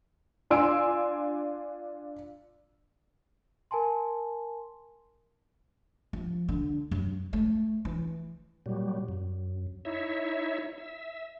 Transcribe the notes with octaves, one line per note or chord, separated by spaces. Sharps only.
D4 F4 G#5 C6 E6 D7
A#4 G#5 A5 C6
F3
D3
F#2
A3
E3
A#2 F#3 G3
F#2
D#4 E4 C#5 E5
E5